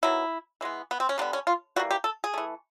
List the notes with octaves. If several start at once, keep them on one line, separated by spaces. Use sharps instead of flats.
D#3 F#3 B3 E4
E3 G#3 B3
B3
C4
C#4
D3 G3 B3 D4
C#4
F4
E3 G3 A#3 F#4
G4
A4
G#4
E3 A3